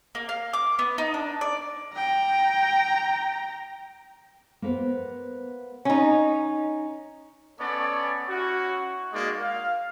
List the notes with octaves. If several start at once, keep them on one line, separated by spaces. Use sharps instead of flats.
A#3
F5
D6
B3
D#4
D4
D5
G5 A#5
A#3 B3 A#4 C5
C#4 D#4
B3 C#4 A4 C#5 D5
C#4 E4 F#4
G#3 A#3 D#4 F#4 D5
F5